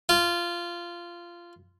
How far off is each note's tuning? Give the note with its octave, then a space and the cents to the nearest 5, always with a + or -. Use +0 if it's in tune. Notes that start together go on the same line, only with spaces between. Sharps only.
F4 -15